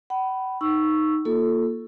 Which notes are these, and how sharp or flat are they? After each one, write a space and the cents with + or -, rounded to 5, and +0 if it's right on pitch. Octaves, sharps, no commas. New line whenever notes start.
F#5 +45 B5 +0
D#4 +0 C#6 +0 E6 +10
A#3 +0 F4 +10 A4 +0